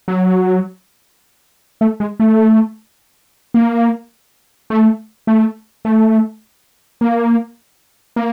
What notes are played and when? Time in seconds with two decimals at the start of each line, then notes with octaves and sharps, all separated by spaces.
0.08 F#3
1.81 A3
2.00 G#3
2.20 A3
3.54 A#3
4.70 A3
5.27 A3
5.85 A3
7.01 A#3
8.16 A#3